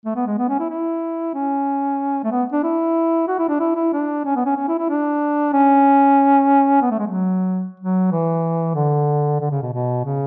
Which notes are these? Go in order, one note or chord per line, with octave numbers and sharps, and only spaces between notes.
A3
B3
G#3
B3
C#4
E4
E4
C#4
A3
B3
D4
E4
F#4
E4
D4
E4
E4
D4
C#4
B3
C#4
C#4
E4
E4
D4
C#4
B3
A3
G#3
F#3
F#3
E3
D3
D3
C#3
B2
B2
C#3